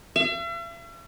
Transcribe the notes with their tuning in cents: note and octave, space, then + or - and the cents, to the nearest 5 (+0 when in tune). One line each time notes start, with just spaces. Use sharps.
E5 +45